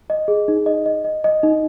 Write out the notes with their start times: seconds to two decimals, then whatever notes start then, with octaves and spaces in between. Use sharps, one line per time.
0.10 D#5
0.28 G#4
0.48 D#4
0.66 D#5
0.86 D#5
1.04 D#5
1.24 D#5
1.43 D#4